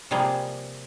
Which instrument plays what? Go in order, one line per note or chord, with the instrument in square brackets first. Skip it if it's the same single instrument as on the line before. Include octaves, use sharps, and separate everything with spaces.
[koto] C3 F3 G3 A#3 G#4